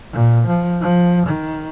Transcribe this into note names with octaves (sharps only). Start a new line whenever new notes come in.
A#2
F3
F3
D#3